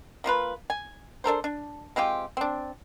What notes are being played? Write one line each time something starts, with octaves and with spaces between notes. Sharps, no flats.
F3 A#3 F4 B4
G#5
D4 A4 A#4 C5
D4
G#3 C4 F4 G4
C4 D4